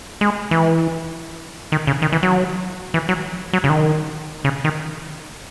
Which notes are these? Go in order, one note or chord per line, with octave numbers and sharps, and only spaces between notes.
G#3
E3
D#3
C#3
D#3
E3
F#3
E3
F#3
F#3
C#3
D#3
C#3
D#3